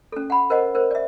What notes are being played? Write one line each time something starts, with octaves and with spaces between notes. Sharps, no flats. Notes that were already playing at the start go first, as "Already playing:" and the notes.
C#4 A4
F#5 B5
A#4 C5 D#5 F#5
A#4 C5
D5 E5